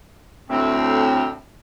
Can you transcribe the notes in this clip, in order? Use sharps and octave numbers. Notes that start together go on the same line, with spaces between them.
D2 A2 C4